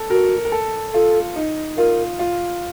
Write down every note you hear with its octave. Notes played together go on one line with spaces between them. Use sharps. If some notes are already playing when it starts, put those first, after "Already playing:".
Already playing: A4
F#4 A#4
A#4
A4
F4 A4
D#4
F4 A#4
F4